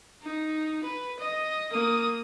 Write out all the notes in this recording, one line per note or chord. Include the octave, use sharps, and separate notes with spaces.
D#4
B4
D#5
A#3 D#6